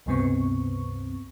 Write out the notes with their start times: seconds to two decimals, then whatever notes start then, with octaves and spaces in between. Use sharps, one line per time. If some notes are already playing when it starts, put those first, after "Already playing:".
0.06 C#2 G2 C3 B3 C4 C#6